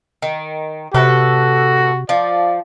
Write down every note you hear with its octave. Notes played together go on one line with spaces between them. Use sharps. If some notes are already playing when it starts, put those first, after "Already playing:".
D#3
A2 C3 F#4 A4 B4
F3 D5